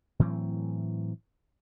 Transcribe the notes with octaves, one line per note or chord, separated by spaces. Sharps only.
A2 E3 F#3 C4